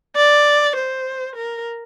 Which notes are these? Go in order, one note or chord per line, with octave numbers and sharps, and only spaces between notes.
D5
C5
A#4